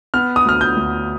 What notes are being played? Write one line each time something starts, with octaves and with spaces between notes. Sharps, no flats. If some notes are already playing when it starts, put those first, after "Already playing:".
B3 F6
D#6
D2 F6
G6
D2